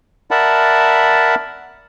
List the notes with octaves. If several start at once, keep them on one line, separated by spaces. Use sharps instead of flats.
A#4 D5 E5 F#5 A5 B5